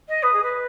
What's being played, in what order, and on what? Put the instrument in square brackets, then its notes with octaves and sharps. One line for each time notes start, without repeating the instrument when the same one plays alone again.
[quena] D#5
[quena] B4 [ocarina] D#6
[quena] G#4
B4